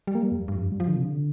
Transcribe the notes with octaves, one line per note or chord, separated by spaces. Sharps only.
G3
A#3
G3
F2
G2
F2
G2
G3
F3
D3
C3
D3